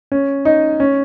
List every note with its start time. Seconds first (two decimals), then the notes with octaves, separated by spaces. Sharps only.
0.12 C#4
0.45 D#4
0.80 C#4